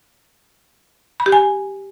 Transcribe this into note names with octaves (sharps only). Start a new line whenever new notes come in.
B5
G4
G#5